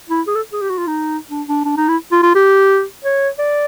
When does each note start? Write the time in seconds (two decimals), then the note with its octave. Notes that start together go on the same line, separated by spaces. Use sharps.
0.09 E4
0.27 G#4
0.35 A4
0.53 G#4
0.62 G4
0.70 F#4
0.78 F4
0.87 D#4
1.30 D4
1.48 D4
1.65 D4
1.77 D#4
1.88 E4
2.12 F4
2.23 F4
2.35 G4
3.04 C#5
3.39 D5